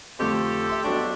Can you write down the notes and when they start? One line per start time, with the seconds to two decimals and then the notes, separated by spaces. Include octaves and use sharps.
0.19 F2 D3 A3 G4 A4
0.67 E5 C6 D6
0.83 B1 D4 F#4 D6